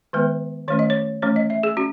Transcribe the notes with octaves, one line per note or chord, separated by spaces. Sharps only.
D#3 G#3 B3 B4
D#3 A3 C#4 C#5
D#5
C#5
E3 A3 C#4 C#5
D#5
E5
G#4
C#4 F#4